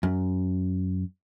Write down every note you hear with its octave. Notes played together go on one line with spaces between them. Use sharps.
F#2